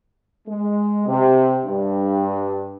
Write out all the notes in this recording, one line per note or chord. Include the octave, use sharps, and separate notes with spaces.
G#3
C3
G2